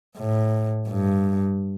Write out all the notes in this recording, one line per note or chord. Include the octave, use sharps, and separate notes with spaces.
A2
G2